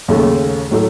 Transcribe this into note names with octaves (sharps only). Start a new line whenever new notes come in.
D#2 C#3 A3
A2 F#3 A3